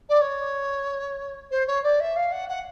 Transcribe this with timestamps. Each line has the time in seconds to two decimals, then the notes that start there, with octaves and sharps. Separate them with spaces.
0.09 D5
0.21 C#5
1.50 C5
1.67 C#5
1.83 D5
2.00 E5
2.15 F5
2.31 F#5
2.48 F#5